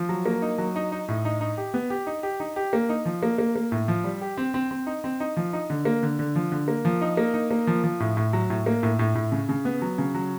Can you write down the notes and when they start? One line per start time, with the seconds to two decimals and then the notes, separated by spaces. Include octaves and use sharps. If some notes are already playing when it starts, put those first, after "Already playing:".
Already playing: F3
0.09 F#3
0.26 A#3
0.42 D#4
0.58 F#3
0.76 D#4
0.92 D#4
1.08 A2
1.25 D#4
1.41 D#4
1.57 G4
1.74 B3
1.90 G4
2.07 D#4
2.23 G4
2.40 D#4
2.56 G4
2.73 A#3
2.89 D#4
3.05 F3
3.23 A#3
3.38 A#3
3.56 A#3
3.72 A2
3.88 F3
4.04 G3
4.21 G4
4.37 C4
4.54 C4
4.71 C4
4.87 D#4
5.04 C4
5.20 D#4
5.37 F3
5.53 D#4
5.70 D3
5.85 A#3
6.03 D3
6.19 D3
6.36 F3
6.52 D3
6.68 A#3
6.85 F3
7.01 D#4
7.17 A#3
7.34 D#4
7.51 A#3
7.67 F3
7.84 F3
8.00 A2
8.17 A2
8.33 F#3
8.50 A2
8.66 A#3
8.83 A2
8.99 A2
9.15 A2
9.32 C#3
9.49 C#3
9.65 B3
9.82 F#3
9.98 C#3
10.14 F#3